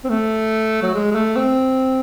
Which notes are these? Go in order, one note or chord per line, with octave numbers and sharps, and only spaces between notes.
C4
A3
F#3
G#3
G#3
A3
C4